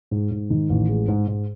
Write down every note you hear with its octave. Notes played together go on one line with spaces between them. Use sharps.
G#2
G#2
D#3
A1
G#3
G#2
G#2